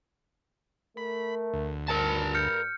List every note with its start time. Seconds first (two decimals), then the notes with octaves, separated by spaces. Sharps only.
0.97 A3 A#4 B5
1.54 D2
1.89 G2 A#4 A5
2.35 F6 G6 C#7